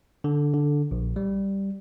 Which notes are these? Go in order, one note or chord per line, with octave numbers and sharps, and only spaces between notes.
D3
D3
A#1
G3